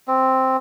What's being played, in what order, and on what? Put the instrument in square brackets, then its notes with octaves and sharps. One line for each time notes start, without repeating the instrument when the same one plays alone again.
[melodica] C4